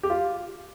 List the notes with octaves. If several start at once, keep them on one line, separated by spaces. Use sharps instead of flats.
G4
F4